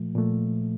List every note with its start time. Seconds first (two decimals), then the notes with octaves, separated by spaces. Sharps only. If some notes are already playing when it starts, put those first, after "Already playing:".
Already playing: A#2 F3 A3
0.15 A#2 F3 A3